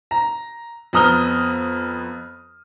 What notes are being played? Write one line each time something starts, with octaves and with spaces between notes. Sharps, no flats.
A#5
F2 B3 A#5 D#6 F6 G7